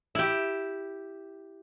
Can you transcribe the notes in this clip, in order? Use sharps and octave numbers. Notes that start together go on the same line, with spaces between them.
E4 G4